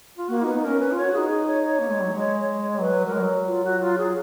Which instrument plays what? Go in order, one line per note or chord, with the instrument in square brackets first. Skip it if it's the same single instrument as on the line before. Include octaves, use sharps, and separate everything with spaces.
[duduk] F4
[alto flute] A#3 [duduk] F#4
[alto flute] B3 [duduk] D#4
[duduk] D#4
[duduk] C#4 [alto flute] A#4
[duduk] C#4 [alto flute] B4
[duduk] F4 [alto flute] C#5
[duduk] F#4
[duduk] D#4 [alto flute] G#4
[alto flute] G#4
C#5
C#5
[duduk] A#3
G#3
F#3
G#3
[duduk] F#3 [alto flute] B4
[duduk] F#3 [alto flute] A#4
[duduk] G#3
F#3
[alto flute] F4
F#4
F4
G#4